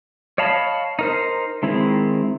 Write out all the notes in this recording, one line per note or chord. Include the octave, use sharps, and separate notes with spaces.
C#5 D#5 F5 A5 B5
D#4 A#4 C5
D#3 G#3 C4 E4